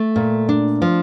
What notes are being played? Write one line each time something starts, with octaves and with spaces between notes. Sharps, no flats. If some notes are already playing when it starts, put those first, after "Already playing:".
Already playing: A3
A#2
D4
F3